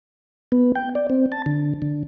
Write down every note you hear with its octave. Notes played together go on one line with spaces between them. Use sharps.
B3
G5
D5
C4
A5
D3
D3